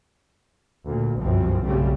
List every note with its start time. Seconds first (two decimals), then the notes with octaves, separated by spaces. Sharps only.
0.86 D2 A#2
1.20 G1 C2 F#2 B2 F3 C4
1.64 B1 C#3 G3 A3 C4